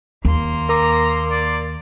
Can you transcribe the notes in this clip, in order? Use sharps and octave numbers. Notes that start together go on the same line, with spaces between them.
D#2 A#3 C6
A#4 A#5 D6
D5